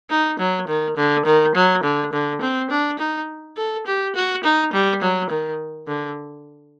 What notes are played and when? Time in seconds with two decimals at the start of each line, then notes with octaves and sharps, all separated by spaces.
0.10 D#4
0.39 F#3
0.68 D#3
0.97 D3
1.25 D#3
1.55 F#3
1.84 D3
2.13 D3
2.41 C4
2.70 D4
2.99 D#4
3.57 A4
3.86 G4
4.15 F#4
4.44 D#4
4.73 G3
5.02 F#3
5.30 D#3
5.88 D3